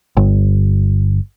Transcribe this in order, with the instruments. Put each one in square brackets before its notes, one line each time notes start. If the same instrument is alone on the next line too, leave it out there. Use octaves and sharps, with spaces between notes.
[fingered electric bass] G1